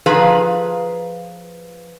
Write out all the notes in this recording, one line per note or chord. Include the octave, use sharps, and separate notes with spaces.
F3 G#4 B4 F5 A#5